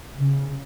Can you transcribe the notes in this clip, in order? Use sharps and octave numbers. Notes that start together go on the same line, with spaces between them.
C#3